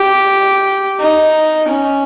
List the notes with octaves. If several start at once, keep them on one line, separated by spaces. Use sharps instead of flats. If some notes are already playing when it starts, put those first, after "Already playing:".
Already playing: G4
D#4
C#4